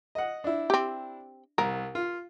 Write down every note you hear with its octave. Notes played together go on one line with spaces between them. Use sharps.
D#5 F#5
D4 E4
C4 G4
C2 A#4
F4